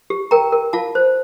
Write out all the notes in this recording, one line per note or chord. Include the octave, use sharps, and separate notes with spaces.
G4
A#4 G5 A#5
A#4
F4 F5 A5
C5